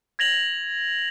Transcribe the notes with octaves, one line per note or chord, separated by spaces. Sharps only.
G#6 A#6 F7 F#7